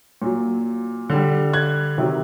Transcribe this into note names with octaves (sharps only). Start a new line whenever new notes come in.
A#2 F#3
D3 G3
F#6 G#6
C3 D#3 F#3